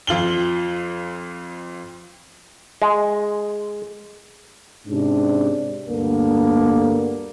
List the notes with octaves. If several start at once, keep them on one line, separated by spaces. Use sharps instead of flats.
F2 F4 F#7 G7
G#3
G#2 C3 C#4 D4
D2 G2 A#3 B3 D4 A4